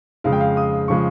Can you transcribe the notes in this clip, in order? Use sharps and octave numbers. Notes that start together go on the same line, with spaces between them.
F2 C#3 F3 G#3 F5
G5
F5
D#6
C#3 F3 G#3 C#6